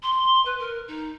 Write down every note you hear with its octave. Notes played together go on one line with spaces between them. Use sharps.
C6
B4
A#4
D#4